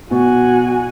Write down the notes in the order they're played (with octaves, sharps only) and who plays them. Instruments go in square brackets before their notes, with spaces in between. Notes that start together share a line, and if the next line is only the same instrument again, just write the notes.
[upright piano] B2 [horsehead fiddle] F#4 G#5